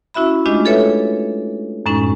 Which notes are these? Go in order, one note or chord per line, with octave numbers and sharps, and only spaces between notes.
C#4 E4 F#4 E5 B5
G#3 A3 D4 F4 G4 D#5
G#4 A4 B4 C#5 E5
F#2 A2 G#3 C#4 D#4